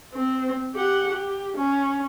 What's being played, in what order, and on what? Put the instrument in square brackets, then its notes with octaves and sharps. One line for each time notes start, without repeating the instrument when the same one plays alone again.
[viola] C4
G4 F#5
G4
C#4